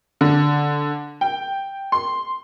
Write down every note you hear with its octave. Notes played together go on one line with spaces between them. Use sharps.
D3
G5
C6